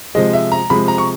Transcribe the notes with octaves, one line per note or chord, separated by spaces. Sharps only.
C3 F3 G#3 D#5
E5
A#5
C3 F3 G#3 B5
A#5
C#6